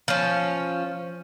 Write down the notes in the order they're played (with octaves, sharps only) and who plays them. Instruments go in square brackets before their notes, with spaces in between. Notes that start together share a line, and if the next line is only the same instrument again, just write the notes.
[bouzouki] F3 C#4